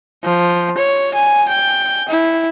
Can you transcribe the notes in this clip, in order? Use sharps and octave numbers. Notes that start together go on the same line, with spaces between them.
F3
C#5
G#5
G5
E4